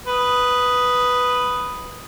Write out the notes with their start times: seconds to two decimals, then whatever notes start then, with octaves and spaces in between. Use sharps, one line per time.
0.07 B4 D#6